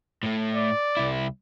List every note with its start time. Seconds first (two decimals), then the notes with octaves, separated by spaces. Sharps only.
0.23 A2 A3
0.55 D5
0.97 C2 E4